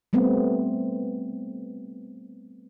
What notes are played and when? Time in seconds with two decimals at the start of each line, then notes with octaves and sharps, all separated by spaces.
0.13 G3 A3 B3 C4